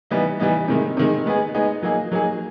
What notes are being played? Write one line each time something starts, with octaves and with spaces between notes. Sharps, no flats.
E3 G3 B3 D#4
E3 G3 B3 D#4
C3 D#3 G#3
C3 D#3 G#3
G#3 B3 D#4 G#4
G#3 B3 D#4 G#4
F#3 A#3 D#4 G#4
F#3 A#3 D#4 G#4